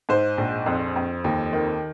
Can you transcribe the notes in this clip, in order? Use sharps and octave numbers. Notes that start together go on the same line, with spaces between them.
G#2 C5
A#1
F2
F2
D#2
D#3